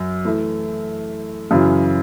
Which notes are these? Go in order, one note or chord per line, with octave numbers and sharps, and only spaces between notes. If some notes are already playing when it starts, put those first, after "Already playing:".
Already playing: F#2
E3 A3 E4
F#2 C#3 E3